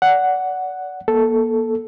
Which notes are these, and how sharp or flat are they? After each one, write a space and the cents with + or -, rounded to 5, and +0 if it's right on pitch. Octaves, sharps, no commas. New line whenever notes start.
D5 -30 F#5 +0
A#3 +35 A4 +0